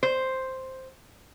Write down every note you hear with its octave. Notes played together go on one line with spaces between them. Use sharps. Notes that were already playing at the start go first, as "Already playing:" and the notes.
C5